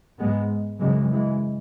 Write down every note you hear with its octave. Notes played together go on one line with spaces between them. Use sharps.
G#2 G#3 B3
F#2 C#3 E3 G#3
E3 G#3